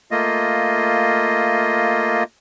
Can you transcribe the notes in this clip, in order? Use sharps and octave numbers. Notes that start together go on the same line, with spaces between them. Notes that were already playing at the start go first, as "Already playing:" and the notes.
A3 A#3 F4 D#5